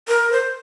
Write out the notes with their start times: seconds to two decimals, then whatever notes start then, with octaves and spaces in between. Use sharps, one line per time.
0.08 A#4
0.32 C5